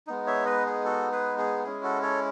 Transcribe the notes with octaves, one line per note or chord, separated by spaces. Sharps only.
G#3 B3 D#4
C#5 E5
B4 D#5
G#4
F#4 A4
G#4 B4
G#4
G#3 C#4 E4 G#4
F#4 A4
A4 C#5